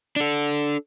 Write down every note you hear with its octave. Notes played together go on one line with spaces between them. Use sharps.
D4 A4